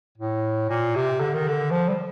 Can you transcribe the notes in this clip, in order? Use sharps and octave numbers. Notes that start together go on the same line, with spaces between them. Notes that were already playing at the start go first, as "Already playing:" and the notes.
A2
A#2
C3
D3
D#3
D3
F3
G3